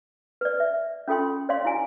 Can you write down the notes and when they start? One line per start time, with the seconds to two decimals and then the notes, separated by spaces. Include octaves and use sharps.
0.41 B4 D5
0.60 E5
1.08 C#4 F4 A4 G5 C6
1.49 C#5 D5 F5 C6
1.65 E4 F#4 G#5